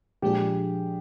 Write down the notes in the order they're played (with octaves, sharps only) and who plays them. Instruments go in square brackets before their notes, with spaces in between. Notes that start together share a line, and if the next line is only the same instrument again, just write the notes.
[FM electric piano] A#2 F3 G#3 D4 G#4 [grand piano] G4